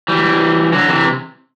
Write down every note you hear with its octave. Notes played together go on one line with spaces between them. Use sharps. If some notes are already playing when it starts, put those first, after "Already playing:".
E3 G3
D3 F#3
C3 E3